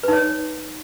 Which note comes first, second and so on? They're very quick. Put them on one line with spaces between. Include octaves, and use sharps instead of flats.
B4 D#4 C#5